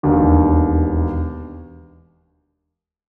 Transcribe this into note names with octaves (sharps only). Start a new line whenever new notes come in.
E1 D#2 D3